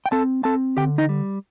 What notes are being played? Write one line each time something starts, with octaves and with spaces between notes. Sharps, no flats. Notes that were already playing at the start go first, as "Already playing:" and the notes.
G5
C4 A4 A5
C4 A4 A5
D3 G4 G5
D#4 D#5
G3